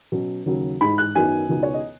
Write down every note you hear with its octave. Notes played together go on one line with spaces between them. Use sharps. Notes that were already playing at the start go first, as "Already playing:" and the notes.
B2 F#3 C#4
D#2 C#3 F#3
G#2 G#3 D#4 B5
F#6
F#2 D#3 F#3 B3 D#4 G#5
C#2 B2 B3 D#4
C#5
D#5